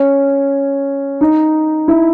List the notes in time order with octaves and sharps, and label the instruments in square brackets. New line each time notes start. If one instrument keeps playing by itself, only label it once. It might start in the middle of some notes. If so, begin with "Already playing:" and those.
Already playing: [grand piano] C#4
D#4
E4